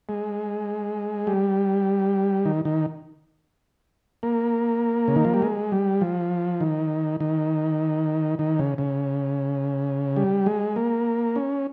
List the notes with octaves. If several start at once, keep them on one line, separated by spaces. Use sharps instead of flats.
G#3
G3
D#3
D#3
A#3
C#3
D#3
F3
G3
G#3
G3
F3
D#3
D#3
D#3
C#3
C#3
G3
G#3
A#3
C#4